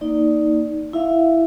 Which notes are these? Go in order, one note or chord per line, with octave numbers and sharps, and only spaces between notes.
A#3 D#4 D5
E4 E5 F5